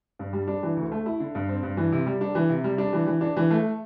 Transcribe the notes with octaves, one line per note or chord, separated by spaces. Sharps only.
G2
G3
D4
E3
D2
A3
E4
D3
G2
C4
G2
E3
C3
G3
D4
E3
C3
G3
D4
E3
E3
D4
E3
A3